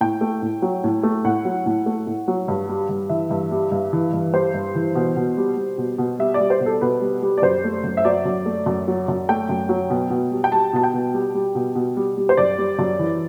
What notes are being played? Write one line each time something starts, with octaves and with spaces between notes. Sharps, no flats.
A2 G5
A3
A2
F#3
A2
A3
A2 F#5
F#3
A2
A3
A2
F#3
G2
G3
G2
E3 E5
G2
G3
G2
E3
G2
G3 C5
G2
E3
B2
B2
G3
G3
B2
B2
G3 E5
D5
G3
C5
B2
A4
B2 B4
G3
G3
D5
F#2 C5
A3
F#2
E5
F#3 D5
F#2
A3
F#2
F#3
F#2
A3 G5
F#2
F#3
B2
B2
G3
G5
G3 A5
B2 A5
G5
B2
G3
G3
B2
B2
G3
G3
C5
F#2 D5
G3
F#2
E3